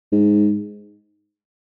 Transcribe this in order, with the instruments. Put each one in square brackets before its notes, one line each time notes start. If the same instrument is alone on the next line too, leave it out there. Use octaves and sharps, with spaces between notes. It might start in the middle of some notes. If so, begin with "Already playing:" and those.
[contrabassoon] G#2